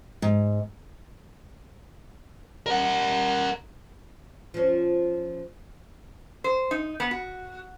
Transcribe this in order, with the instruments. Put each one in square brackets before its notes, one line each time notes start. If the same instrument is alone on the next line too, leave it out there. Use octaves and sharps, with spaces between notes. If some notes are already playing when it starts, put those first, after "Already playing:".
[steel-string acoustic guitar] G#2
[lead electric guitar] A#4 F#5
[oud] F3 C#4
[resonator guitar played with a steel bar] C5
D#4
B3
F#4